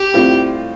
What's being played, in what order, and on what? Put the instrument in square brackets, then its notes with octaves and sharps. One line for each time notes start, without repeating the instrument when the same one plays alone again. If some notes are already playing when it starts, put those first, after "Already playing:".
Already playing: [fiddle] G4
[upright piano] A2 G3 C4 F4